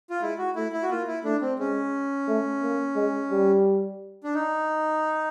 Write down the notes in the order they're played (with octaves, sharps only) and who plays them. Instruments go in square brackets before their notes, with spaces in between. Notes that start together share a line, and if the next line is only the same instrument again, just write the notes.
[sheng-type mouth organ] F4
[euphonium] G#3 [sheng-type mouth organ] E4
[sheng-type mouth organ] F#4
[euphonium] A3 [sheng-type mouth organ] E4
[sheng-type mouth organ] E4
F#4
[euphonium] A#3 [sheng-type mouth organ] F4
[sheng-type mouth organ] E4
[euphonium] A3 [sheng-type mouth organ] D4
[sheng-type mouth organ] C4
[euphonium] G#3 [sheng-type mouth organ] C#4
[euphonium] A3
A#3
G#3
G3
[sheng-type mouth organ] D4
D#4